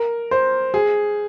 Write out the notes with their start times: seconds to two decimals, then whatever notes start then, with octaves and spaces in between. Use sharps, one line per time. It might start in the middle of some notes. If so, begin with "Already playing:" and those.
Already playing: A#4
0.31 C5
0.74 G#4